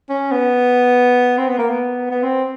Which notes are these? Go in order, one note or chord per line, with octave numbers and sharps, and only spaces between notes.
C#4
B3
C4
B3
A#3
B3
B3
C4